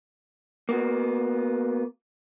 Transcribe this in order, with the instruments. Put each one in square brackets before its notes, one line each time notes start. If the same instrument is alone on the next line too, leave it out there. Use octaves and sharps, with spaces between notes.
[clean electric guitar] A#3 B3 F#4